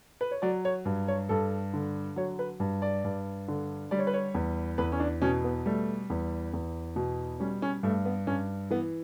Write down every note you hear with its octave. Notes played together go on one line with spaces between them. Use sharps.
B4
C#5
F#3 D5
C#5
G2
C#5
G2 A4
D3
F#3 C#5
B4
G2
D5
G2
D3
G3 D5
C#5
B4
C#5
E2
E2 B4
C#4
D4
B2 C#4
B3
G3 A3
E2
E2
B2
G3 C#4
C#4
G2 A3
B3
G2 C#4
E3 B3